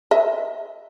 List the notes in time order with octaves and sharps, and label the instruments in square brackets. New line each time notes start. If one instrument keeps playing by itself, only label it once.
[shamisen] D#5 E5